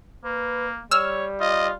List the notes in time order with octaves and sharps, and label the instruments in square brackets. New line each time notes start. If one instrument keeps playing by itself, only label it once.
[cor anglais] A#3 [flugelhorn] B4
[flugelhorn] G3 [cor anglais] C#5 [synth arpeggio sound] E6 F6
[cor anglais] F4 [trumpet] D#5